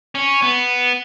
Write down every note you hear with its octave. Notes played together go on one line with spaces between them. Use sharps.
C#4
B3